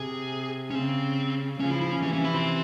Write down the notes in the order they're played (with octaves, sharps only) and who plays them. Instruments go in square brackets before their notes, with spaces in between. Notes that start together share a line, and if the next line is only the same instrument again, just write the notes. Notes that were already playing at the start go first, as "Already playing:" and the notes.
Already playing: [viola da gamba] C3 [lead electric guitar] G#4
[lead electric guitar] C#4
[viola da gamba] C#3 [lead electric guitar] C4
[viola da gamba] C#3 F3 [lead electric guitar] C#4
[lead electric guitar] E4
E4
C#4
[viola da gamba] C3 E3 [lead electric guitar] C#4
[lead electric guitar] C#4
E4
C4